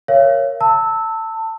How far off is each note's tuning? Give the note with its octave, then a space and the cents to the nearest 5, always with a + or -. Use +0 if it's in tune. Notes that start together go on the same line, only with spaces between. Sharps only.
A#4 +0 C#5 +0 F5 -35
A5 +25 E6 -10